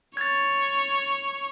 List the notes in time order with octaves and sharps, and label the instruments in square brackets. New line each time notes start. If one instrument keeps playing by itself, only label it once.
[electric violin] C#5 [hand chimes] G#6 A6